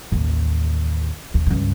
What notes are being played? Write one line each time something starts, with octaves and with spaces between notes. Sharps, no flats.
A1 D#2
D#2
C#2 G2